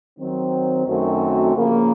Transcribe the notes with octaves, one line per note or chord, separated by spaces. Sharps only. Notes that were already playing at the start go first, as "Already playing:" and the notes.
D#3 F#3 C4
F#2 D#3 A3 C4 F#4
C#3 F3 A#3